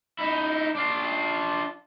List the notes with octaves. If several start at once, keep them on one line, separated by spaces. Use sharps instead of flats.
D#4 E4
D4 F4